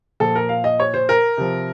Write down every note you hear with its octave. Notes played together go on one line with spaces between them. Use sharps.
A#2 F3 A4
A#4
F5
D#5
C#5
C5
A#4
C3 F3